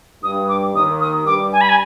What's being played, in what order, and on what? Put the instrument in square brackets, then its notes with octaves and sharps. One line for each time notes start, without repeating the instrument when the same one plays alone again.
[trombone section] G2 [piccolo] D#6
[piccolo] D6
[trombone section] D#2 D#3 [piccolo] D#6
[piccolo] D#6
[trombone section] G2 G3 [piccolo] D6
[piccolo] G#5
B5
G#5